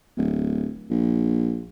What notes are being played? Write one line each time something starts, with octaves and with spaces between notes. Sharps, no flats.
D1
A#1